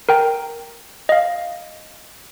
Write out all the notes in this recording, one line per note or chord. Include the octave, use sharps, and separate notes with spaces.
A#4 G5 A#5
D#5 F5